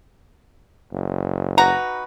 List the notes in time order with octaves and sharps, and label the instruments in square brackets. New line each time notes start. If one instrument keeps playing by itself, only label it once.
[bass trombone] F#1
[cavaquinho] D#4 F#4 B4 [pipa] A#5